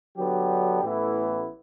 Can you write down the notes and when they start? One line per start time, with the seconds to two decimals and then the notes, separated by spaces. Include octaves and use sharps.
0.17 D3 F#3 B3 D4 G4
0.83 A1 A2 E3 B3 E4